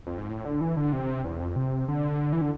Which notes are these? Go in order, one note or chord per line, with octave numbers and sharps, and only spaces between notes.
F2
G#2
A2
D3
E3
D3
C3
E2
F2
C3
D3
E3
D3